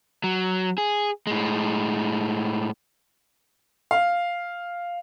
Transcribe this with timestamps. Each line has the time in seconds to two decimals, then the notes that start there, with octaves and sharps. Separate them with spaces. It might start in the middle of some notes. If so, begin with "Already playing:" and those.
0.24 F#3
0.78 G#4
1.27 A2 G#3
3.91 F5